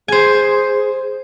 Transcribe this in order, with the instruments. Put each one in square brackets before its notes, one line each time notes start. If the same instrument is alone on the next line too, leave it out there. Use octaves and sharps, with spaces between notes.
[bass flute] G#4 [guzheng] C5 G#5